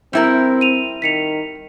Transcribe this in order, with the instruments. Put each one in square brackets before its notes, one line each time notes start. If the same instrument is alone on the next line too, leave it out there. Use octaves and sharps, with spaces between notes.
[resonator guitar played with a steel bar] G3 E4 A#4 [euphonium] C4
[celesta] D#7 F7
[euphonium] D#3 [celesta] B6 C#7 F7